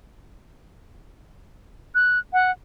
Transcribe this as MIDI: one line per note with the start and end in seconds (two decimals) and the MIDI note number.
1.95 2.19 90
2.33 2.51 78